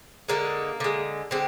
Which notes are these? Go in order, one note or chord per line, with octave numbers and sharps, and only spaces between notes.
D3 G#3 A#3
D3 G#3
D3 G#3 C4